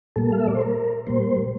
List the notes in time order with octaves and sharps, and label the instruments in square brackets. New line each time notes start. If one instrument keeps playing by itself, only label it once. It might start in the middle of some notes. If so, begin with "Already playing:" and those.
[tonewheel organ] A#2 G3 A#3 A4
F5
E5
D5
C5
A#4
A#2 G3 A#3 C5